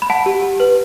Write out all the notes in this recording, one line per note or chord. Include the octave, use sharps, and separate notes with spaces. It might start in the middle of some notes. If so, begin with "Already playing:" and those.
B5
F#5 A5
G4
G4
B4